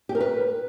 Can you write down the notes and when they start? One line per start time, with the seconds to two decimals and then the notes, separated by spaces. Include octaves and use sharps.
0.09 G4
0.15 A#4
0.20 B4